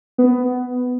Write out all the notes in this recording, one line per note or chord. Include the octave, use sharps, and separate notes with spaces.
B3